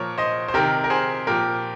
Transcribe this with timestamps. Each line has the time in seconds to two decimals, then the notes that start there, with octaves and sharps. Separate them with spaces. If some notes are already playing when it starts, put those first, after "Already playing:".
Already playing: A#2 F3 A#4 C#5
0.18 C5 D#5
0.48 C5
0.54 C3 D#3 G4 A#4
0.84 A#4
0.90 G#4 C5
1.27 A#2 F3 G4 A#4